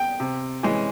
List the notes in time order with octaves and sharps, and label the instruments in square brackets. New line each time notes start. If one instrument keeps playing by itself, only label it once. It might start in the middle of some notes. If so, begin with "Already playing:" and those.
Already playing: [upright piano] G5
C3
E3 G#3 C#4